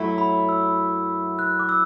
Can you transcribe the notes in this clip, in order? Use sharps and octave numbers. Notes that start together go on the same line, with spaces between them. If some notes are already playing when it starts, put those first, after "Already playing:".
Already playing: F#2 F#3 A3 E4
B5
E6
F#6
D6
E6